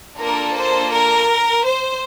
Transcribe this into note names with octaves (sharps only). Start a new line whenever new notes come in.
A#3 D4 F4 A4 A#4
C5
A#4
C5